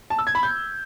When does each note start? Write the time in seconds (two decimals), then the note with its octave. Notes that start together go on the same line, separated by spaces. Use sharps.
0.10 A5
0.19 E6
0.27 G#6
0.35 B5
0.43 G6